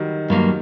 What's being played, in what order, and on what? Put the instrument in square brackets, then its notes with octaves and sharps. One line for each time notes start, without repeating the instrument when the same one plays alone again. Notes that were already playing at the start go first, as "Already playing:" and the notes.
Already playing: [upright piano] D#3 F#3 G3
[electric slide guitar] G2 F#3 A#3